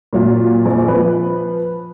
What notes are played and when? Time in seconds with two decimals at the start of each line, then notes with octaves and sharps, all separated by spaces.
0.13 A#2 F#3 F4
0.66 A#1
0.88 F3 B4